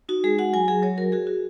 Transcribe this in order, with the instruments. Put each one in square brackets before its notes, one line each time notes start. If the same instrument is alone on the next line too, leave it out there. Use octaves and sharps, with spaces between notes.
[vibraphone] D#4 F#4
G#3 G#4
F#4 F#5
F#3 G#5
F#3 G#4
F#3 C#5
F#4 A#4
F#4 G#4
F#4